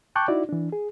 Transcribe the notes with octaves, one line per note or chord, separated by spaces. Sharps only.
G5 A5 C#6 D6 F#6 G6
D#4 E4 F#4 D5
E3 D4
G#4